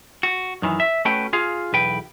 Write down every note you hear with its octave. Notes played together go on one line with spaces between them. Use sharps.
F#4
F#2 D#3 E3
E5
A3 C#4 F#4 B4 G5
F4 G#4 F5
B1 E2 B4 G5